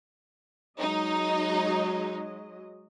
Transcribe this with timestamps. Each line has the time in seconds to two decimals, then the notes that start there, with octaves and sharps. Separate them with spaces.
0.79 F#3 G#3 D#4 D#5